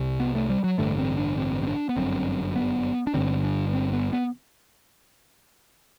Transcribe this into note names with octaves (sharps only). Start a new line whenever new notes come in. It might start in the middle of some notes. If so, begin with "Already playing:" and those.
Already playing: C2 C3
B3
A3
G3
F#3
A1 G2 D3 A3
C4
D4
C4
C4
D4
B3
G1 F#2 D3 C4
B3
D4
G1 G2 D3 C4
D4
C4
B3
B3